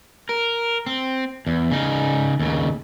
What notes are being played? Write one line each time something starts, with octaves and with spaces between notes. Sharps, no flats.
A#4
C4
E2
C#3 D#4
D#2 C#3